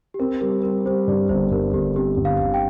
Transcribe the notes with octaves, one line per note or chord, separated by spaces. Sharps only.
G4
C4 A#4
G3 A#4
G3 A#4
G3 C5
G2 D5
G1 C5
G2 A#4
G1 G4
C4 G4
G1
F5
G1
G5